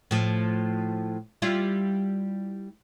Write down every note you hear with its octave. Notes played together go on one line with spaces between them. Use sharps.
A2 F3
G3 E4 F4